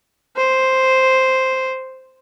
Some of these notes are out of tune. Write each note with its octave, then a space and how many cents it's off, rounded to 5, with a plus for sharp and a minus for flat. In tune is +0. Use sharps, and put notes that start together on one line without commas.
C5 +0